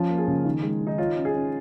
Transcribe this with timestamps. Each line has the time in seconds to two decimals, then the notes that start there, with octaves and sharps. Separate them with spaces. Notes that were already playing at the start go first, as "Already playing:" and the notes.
Already playing: F3 C#4 F4
0.10 A#3
0.18 G#4
0.28 C#3
0.45 D#3
0.63 G#3
0.81 D#3
0.87 D#4
0.98 F4 C#5
1.16 C#4
1.25 G#4
1.35 C#4